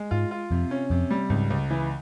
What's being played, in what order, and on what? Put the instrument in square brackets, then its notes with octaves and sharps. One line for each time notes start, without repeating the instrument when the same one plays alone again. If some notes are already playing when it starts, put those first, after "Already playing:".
Already playing: [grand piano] G#3
[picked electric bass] G#2 [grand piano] F4
[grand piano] F4
[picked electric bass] F2 [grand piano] C3
[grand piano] C#4
[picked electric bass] F2 [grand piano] C3
[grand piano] G3
[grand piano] C#2 [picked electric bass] G#2
[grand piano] C#2
E3